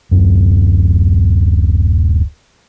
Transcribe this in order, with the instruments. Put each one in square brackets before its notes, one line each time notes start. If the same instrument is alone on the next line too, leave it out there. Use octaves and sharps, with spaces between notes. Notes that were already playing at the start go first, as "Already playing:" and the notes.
[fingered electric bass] D1 F#2